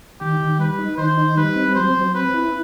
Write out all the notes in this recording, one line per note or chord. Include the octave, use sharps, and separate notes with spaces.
D#3 G4
D#3
G3 B4
D#4
D#3 C5
D#4
G3 B4
C4
F#3 C5
F#3
C4 B4
E4